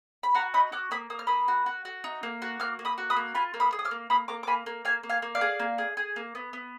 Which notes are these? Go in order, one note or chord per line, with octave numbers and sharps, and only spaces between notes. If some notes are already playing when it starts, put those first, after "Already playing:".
B5
F#4 F#5 A#5
D#4 B5 D#6
F#4 D6 F6
A#3 B5 D#6
A#3 D#6
F6
A#3 B5 D#6
F#4
F#4
F#4
D#4
A#3
F#4
A#3 D6 F6
A#3
B5 D#6
F#4
B5 D#6
A#3
F4 G#5 B5
A#3
B5 D#6
G#4
D#6
D6 F6
A#3
A#3 B5 D#6
A#3 A#5 D6
D6
A#3 G#5 B5
A#3
A#3 F5 G#5
A#3
F5 G#5
A#3
D5 F5
G#4
A#3
G#4
G#4
A#3
B3
B3